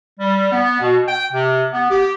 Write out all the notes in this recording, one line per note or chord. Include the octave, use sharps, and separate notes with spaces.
G3
B3
B2
G5
C3
B3
G4